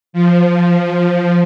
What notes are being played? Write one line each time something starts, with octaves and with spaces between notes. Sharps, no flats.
F3